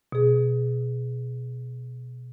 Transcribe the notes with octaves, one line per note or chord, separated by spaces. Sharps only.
B2 G#4